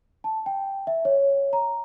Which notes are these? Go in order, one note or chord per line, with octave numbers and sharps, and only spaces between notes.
A5
G5
E5
C#5
A#5